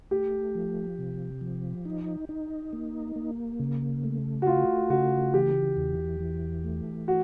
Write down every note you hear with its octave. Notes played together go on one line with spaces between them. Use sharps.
A3 G4
F3
C3
F3
D#4
D#4
A#3
A#3
C#3
A3
F#4
A3 F4
C#3 F#4
E3 G4
E2
E3
A3
F#4